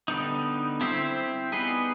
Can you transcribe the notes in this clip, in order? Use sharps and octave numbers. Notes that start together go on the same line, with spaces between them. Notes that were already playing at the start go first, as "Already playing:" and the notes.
D3 G3 B3 D#4
C4 E4 G4 C5
G3 B3 D#4 G#4 B4